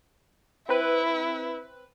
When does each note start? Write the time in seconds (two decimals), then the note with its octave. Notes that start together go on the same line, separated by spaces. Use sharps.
0.69 C4 E4 B4